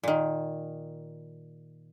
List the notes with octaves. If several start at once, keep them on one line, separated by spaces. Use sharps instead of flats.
A#2 D#3